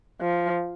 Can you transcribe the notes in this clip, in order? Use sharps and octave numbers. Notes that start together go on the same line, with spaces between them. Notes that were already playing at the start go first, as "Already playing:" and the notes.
F3